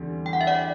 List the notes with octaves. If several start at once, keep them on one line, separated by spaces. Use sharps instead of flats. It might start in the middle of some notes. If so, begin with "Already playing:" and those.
Already playing: E2 D3 G3 C4
G5
F#5
E5
D5 F#5